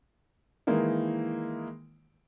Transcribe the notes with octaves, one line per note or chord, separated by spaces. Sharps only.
D#3 E3 G#3 A#3 D#4 E4